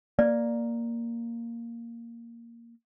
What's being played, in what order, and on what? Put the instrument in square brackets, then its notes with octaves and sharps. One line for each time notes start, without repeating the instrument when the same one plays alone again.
[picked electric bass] A#3 [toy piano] D5